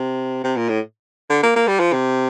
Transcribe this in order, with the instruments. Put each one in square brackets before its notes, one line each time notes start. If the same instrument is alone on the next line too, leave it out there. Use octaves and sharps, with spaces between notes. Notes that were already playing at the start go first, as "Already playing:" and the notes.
Already playing: [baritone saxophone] C3
C3
A#2
A2
D3
A#3
A#3
G3
F3
C3